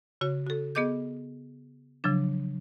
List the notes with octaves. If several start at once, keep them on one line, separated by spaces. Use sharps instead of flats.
C#3 F#4 C#5
F#4 A4
B3 G#4 D#5 D6 G6
C#3 F3 F#3 D4